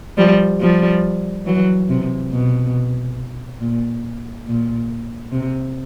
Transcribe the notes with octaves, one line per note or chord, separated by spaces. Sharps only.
F3 G3
F3 G3
E3 F#3
C3
B2
A#2
A#2
C3